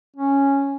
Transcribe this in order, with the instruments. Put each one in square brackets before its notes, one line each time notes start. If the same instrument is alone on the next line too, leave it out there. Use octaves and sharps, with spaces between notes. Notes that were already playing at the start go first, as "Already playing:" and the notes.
[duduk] C#4